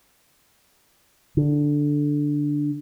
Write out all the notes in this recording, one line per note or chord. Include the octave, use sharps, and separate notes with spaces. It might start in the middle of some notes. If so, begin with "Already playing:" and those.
D3